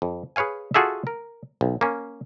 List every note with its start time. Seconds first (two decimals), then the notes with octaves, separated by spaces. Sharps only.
0.02 F2
0.36 G#4 B4 C#5 F5 G#5
0.74 F4 F#4 G#4 A4 E5
1.07 A#4
1.61 B1
1.81 A#3 C#4